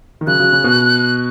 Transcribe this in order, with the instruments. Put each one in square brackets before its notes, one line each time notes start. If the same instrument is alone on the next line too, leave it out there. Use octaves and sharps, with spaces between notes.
[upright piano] D#3
[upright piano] C#3 F#3 [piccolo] F#6
[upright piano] C#3 F#3
C#3
B2